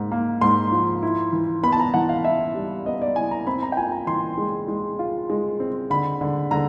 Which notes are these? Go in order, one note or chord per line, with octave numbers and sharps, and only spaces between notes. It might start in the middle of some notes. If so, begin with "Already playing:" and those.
Already playing: G#2 A#3
A#3
G#2 C6
F3
E4
E3
B3 B5
A5
A#5
E3 F#5
F5
E4 E5
G3
B3 D#5
D5
E4 G#5
A#5
C4 B5
A#5
G5
F4 G#5
A#5
E3 C6
G#3
G#3
F4
G#3
C4
D3 B5
D3
D3 A#5